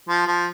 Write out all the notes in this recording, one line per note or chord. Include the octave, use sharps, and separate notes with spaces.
F3
F3